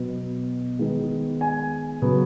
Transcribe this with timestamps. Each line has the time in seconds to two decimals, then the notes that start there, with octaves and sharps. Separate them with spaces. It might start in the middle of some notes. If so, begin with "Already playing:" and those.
Already playing: B2 F#3 B3
0.79 D#3 G#3 B3
1.41 G#5
2.02 C#3 F#3 B3